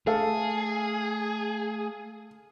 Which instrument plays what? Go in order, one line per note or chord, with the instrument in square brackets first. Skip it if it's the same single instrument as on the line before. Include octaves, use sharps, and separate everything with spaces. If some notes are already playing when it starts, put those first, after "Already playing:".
[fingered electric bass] A3 [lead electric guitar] G#4 [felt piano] A4 F5